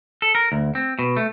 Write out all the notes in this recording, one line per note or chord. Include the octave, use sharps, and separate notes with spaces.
A4
A#4
D2
C4
B2
A3